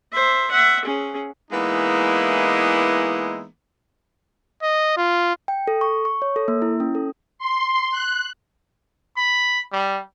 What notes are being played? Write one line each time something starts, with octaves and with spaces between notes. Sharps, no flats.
C5 E5
E5 F#5
C#4 G#4
E3 G#3 A#3 B3 D#4 E4
D#5
F4
G5
A4
C#6
C#6
C#5
A4
A#3
E4
C#4
A4
C6
F#6
B5
G3